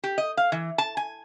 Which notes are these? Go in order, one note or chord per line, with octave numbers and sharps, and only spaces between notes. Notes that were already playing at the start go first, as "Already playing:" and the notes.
G4
D#5
F5
E3
A5
G#5